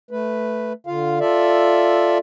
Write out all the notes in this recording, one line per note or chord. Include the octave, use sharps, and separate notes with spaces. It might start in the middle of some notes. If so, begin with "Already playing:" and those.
A3 B4
D3 F4 F5
F4 A4 D5 E5